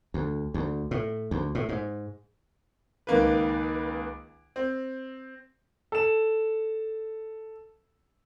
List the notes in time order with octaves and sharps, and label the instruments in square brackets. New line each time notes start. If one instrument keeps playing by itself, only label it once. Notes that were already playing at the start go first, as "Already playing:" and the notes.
[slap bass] D2
D2
A2
D2
A2
G#2
[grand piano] C#2 D#3 A#3 B4
C4
A4 E7